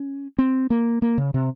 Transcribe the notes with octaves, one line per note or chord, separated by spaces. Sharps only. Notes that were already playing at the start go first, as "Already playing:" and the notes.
Already playing: C#4
C4
A#3
A#3
C#3
C3